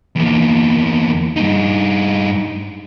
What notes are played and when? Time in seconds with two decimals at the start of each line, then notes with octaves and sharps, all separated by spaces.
0.16 E2 A#3
1.36 G2 D#4